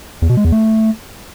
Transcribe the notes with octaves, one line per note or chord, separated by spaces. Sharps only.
E2
B2
G#3
E2
A3